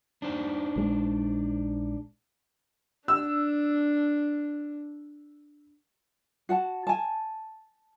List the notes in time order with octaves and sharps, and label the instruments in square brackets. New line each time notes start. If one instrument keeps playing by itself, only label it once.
[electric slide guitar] D4 D#4 C5
[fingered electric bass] A#1 G#3
[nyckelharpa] D4 [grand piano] E6
[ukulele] F#4 F#5 A5
G#5 A5